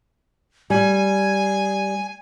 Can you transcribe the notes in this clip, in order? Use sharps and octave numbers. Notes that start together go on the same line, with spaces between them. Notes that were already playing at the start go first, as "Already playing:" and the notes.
G3 G#5